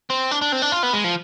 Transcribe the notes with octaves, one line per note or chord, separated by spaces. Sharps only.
C4
D4
D4
C4
D4
F4
B3
G#3
F3